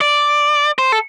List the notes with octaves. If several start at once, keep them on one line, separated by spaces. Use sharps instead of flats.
D5
C5
A4